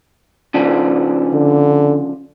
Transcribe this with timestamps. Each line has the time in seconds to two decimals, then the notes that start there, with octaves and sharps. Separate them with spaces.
0.54 C#3 F3 D4
1.33 D3